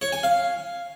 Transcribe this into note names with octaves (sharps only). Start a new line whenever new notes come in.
C#5
G#5
F5